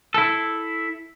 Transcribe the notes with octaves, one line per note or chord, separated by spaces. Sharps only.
E4 A4